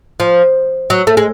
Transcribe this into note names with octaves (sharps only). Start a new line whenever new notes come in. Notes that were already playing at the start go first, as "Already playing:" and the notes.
F3
F#3
A3
G#3